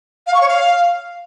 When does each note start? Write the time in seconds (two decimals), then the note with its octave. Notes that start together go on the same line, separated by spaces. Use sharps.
0.27 F5
0.34 C#6
0.41 C#5
0.49 F5